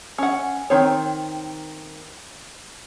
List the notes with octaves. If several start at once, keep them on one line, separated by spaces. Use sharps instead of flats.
C#4 F#5
D#3 C4 C#5